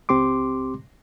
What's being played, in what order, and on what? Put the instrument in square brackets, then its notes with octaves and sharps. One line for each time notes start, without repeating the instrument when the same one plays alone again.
[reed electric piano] C#2 C4 G4 C6 D6